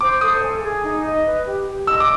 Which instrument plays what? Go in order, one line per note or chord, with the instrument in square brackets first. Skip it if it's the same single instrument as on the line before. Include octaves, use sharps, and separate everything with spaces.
[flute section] C5 [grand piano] D6
[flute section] A4 [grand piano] D#6
[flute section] G#5
G#4
D#4
D#5
B4
G4
G4
[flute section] D#5 [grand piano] E6
[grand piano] D6